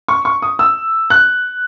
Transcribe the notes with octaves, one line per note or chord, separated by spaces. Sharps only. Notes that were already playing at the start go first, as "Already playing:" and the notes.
C#6
C#6
D#6
E6
F#6